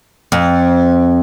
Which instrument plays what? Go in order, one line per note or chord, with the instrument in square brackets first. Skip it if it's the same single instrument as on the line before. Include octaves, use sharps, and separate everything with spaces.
[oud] F2